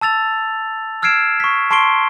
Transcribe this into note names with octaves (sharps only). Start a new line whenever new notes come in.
A5 E6 A6 F7
E6 F6 G#6 C7 D7 E7
C#6 B6
A5 C6 C#6 C7 D7 G7